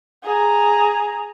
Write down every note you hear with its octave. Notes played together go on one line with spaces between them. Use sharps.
G#4 A#5